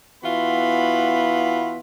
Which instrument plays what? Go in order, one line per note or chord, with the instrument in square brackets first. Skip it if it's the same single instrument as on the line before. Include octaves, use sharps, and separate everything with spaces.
[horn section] E3 B3 F4 F#4 B5